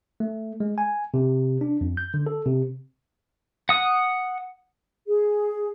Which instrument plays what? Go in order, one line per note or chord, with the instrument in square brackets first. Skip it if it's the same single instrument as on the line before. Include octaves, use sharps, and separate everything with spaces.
[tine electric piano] A3
G#3
G#5
C3
D4
F2
G6
D3
A4
C3
[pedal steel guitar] F#5 D#6
[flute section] G#4